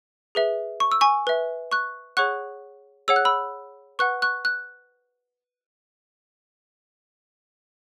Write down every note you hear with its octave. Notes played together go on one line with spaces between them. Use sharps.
G#4 B4 E5
C#6
E6
G#5 C#6
B4 E5
C#6 F#6
G#4 C#5 F#5 C#6 F#6
G#4 C#5 F#5 E6
F#6
B5 E6
B4 F#5 C#6 F#6
C#6 F#6
F#6